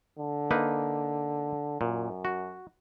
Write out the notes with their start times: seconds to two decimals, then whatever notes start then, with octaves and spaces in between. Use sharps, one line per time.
0.18 D3
0.51 A#3 D#4 B4
1.81 F#2 A#2
2.25 F#4